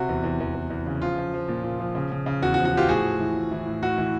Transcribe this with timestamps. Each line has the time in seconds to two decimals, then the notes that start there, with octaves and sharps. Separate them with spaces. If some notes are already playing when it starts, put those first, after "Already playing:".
Already playing: C3 F#4
0.09 E2
0.24 E2
0.40 E2
0.55 E2
0.70 E2
0.86 C#3
1.02 F3 F4
1.18 F3
1.34 F3
1.48 A#2
1.64 A#2
1.80 F3
1.95 C#3
2.12 C#3
2.26 C#3
2.42 E2 F#4
2.54 F#4
2.57 F3
2.65 F#4
2.73 F3 F4 G4
2.88 A2 F#4 G#4
3.05 A2
3.20 E3
3.36 A2
3.51 E3
3.66 A2
3.83 A2 F#4
3.98 E3